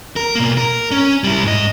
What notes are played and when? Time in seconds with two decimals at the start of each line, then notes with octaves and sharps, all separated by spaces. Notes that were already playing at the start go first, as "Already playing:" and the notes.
0.16 A#4
0.35 B2 A#3
0.57 A#4
0.91 C#4
1.24 G3 E4
1.44 G#2 D#5